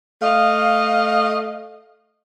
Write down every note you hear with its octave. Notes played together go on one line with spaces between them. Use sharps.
A3 D#5 F5